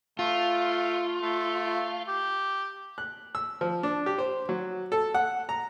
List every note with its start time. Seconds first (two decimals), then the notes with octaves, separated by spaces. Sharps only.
0.19 A3 F4
1.22 A3
2.08 G4
2.98 F#6
3.35 E6
3.61 F3
3.83 D4
4.06 G4
4.19 C5
4.49 F#3
4.92 A4
5.14 F#5
5.49 A#5